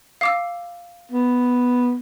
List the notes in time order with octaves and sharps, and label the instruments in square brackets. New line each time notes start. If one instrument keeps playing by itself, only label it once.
[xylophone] F5 D6 E6
[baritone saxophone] B3